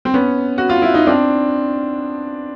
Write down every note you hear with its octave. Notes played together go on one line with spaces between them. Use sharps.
C4
B3 C#4
F#4
F4
E4
D#4
C4 D4